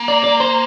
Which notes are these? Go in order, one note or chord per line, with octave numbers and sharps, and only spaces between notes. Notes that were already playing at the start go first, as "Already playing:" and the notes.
Already playing: A#3
D5
D5
C5